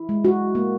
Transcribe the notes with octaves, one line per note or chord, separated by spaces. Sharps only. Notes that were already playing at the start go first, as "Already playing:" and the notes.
Already playing: E4
G#3
F#4
A#3